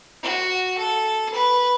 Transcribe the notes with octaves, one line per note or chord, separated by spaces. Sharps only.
F#4
A4
B4